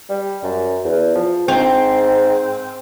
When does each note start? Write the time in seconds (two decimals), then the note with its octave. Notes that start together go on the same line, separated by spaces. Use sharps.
0.09 G3
0.43 F#2
0.84 E2
1.15 F3
1.48 G#2 C4